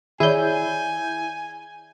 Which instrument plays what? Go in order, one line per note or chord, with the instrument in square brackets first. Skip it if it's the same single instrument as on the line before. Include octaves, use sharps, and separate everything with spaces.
[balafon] D#3 C#5 D5 [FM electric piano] E4 G6 [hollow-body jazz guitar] G#4 [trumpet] G#5